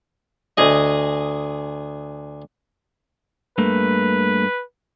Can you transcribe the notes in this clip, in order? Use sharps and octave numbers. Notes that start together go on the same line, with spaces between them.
D2 G#4 D#5
G2 A3 A#3 B4